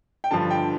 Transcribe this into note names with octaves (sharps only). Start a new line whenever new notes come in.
G5
G2 D3 F3 A5
G5